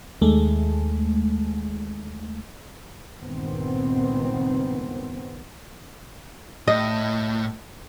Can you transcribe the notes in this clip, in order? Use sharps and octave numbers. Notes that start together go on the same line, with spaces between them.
D#2 G#3 A3
C#2 G2 A#2 D#3 B3 C4
A2 D#5